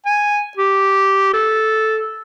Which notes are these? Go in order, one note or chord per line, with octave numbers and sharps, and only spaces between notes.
G#5
G4
A4